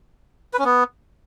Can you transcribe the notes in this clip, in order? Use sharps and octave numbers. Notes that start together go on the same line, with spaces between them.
B4
C#4
B3